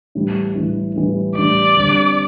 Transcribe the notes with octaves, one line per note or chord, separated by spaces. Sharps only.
A2 E3 G3
A2 E3 G3
A2 E3 G3
A2 E3 G3 D5
D3 G3 C4